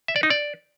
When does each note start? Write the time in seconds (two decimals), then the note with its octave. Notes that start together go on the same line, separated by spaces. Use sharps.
0.08 E5
0.16 D5
0.23 D#4
0.30 D5